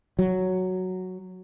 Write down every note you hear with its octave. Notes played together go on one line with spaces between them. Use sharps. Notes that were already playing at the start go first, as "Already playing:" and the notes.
F#3